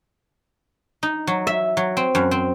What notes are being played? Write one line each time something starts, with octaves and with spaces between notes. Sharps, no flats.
D#4
F#3
E5
F#3
C4
F#2
C4